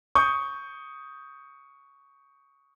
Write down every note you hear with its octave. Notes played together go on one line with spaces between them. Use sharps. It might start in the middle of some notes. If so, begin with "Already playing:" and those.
C#6 D#6 G6